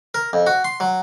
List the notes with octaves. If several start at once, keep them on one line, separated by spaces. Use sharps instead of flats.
A#4
F2
F#4
C6
F#3